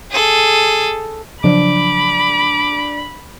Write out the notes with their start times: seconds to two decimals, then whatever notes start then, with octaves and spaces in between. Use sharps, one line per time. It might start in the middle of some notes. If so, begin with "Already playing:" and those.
0.11 G#4 A4
1.44 C#3 F3 F#3 D4 B5 D6